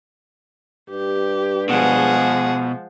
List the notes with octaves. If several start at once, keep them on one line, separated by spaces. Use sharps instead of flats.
G2 G4
B2 F3 G#3 G#4 F#5